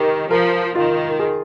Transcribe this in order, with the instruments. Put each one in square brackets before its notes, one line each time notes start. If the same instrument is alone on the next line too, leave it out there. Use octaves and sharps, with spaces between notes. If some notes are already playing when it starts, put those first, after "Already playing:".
Already playing: [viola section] D#3 [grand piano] G4
[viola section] F3 [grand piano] A#4
[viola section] D#3 [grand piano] F4
[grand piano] G#4